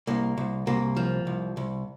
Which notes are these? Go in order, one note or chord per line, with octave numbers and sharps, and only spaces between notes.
C2 A#3
C2
C2 A#3
F3
C2
C2